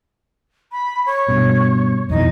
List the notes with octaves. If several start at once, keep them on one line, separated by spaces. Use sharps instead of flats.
B5
C#5
G2 B2
F2 B2 E3 D#4